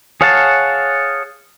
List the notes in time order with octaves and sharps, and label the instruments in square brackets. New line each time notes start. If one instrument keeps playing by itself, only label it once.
[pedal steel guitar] G#4 C#5 F5 F#5 A5